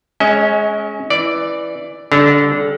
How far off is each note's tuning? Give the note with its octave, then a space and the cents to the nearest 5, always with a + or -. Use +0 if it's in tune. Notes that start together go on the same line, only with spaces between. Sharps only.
G#3 +15 C#4 +0 D#5 +45
E3 +0 D5 +0
D3 -25 G3 +10